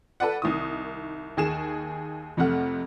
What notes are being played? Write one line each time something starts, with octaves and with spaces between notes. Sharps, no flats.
A4 B4 D5 F#5
C2 D#3 D#6
D#2 G#4 E7
F2 C3 A3 F#5 F6